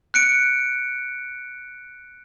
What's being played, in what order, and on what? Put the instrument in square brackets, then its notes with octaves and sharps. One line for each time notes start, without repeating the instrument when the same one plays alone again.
[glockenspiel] F#6 C#7 D7